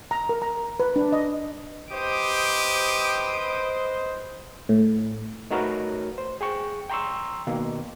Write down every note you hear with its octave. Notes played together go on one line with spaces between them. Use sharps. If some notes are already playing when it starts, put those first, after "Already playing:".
A#5
A#4
A#5
B4
D4
D#5
G4 B4 C5 D#5 D6 D#6
A2
A3 D#4 F#4 A#4 B4 C#5
C5
G#4 G5 C#6
G5 A#5 C6 C#6 E6
B2 D#3 A#3